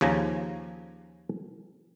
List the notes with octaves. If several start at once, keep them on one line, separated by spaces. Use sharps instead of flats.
D#2 C#3 F3 G#5 A#5